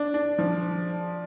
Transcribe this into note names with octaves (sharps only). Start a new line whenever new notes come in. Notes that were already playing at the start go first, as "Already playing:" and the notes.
Already playing: D4
D4
F3